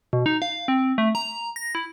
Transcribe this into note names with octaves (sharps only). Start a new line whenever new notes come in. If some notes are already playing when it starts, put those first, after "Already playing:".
B2
D#4
F5
C4
A3
A#5
A#6
E4